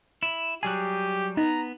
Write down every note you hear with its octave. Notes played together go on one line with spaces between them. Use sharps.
E4
F#3 G3 G4 G#4 G#5 F#6
B3 D#4 A#5